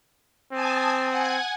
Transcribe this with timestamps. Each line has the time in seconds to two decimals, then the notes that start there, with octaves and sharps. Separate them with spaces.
0.52 C4 G#5 A5 D#6
1.08 F#5 G#5 G#6